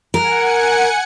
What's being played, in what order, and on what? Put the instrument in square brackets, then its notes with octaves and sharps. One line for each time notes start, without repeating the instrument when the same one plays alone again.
[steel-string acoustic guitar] A#4 [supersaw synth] F#5 G#5 C#7